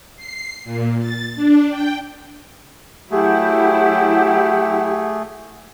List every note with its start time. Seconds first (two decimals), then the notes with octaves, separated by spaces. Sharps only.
0.17 C7
0.64 A#2
0.99 A6
1.36 D4
1.69 G5
3.11 F#3 A3 E4 G4 G#4 F#5